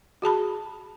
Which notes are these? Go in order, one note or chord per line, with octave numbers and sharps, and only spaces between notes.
F#4 G#4 A5 B5